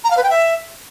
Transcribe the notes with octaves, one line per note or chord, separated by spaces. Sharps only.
A#5
F5
B4
G5
E5